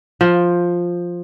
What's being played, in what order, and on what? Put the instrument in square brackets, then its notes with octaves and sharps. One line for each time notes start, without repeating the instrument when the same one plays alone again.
[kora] F3